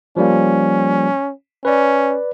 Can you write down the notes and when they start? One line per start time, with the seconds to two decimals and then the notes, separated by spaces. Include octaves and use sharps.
0.17 F3 G3 A#3 C#4
1.65 C#4 B4 D5